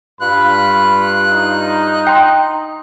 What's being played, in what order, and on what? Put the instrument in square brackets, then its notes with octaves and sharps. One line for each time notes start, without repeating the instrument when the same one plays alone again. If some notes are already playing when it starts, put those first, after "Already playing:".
[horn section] G2 F4 [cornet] B5 [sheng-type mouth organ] F#6
[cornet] D#4
[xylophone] G5 C6